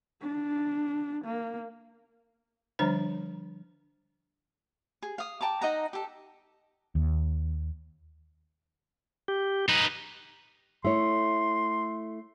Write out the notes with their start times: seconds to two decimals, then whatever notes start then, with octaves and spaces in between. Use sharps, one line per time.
0.22 D4
1.25 A#3
2.79 D3 F3 G3 D4 C5 A#5
5.03 G#4
5.18 F5 D#6
5.41 G5 A5 A#5 D6
5.61 D#4 D#5 F#5 A#5
5.93 G4 A4
6.95 D#2
9.28 G4
9.69 D#4 B4
10.85 A3 E4 C#5 C6